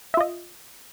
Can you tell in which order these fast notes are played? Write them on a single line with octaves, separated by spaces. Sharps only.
E5 F4 D#5